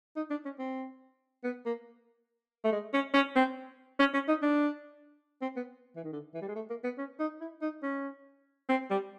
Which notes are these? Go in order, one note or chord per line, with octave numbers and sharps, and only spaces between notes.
D#4
D4
C#4
C4
B3
A#3
A3
G#3
C#4
C#4
C4
C#4
C#4
D#4
D4
C4
B3
E3
D#3
D3
E3
G3
G#3
A3
A#3
B3
C#4
D#4
E4
D#4
C#4
C4
G3